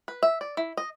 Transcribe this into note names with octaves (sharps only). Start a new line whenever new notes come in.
B4
E5
D5
E4
D#5